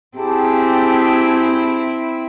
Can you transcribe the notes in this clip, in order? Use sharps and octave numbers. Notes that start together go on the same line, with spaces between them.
C4 E4 G4 G#4 A5